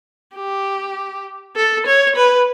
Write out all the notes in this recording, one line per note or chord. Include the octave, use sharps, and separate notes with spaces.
G4
A4
C#5
B4